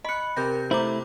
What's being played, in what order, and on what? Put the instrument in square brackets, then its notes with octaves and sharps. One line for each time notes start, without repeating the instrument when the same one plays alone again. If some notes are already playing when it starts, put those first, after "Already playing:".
[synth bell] D#5 C#7 [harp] B5 F#6
[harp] C3 [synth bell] A#4 G6 A#6
[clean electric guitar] A3 E4 [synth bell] C5 A#5 D6